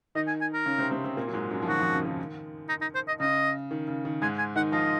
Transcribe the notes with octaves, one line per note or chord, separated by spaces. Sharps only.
D#3 D#4 D#5
G#5
G#5
A#4
C#3 C#4
C3 C4
C3 C4
C3 C4
A#2 A#3
F#3
G#2 G#3
F#2 F#3
F3
D#3 F#4
F2 F3
C#3
D#3
D#4
D#4
C5
D#5
C#3 D#5
D#3
C#3
D#3
G#2 G#3 G#5
G#5
D#3 D#4 F#5
F3 F4 D#5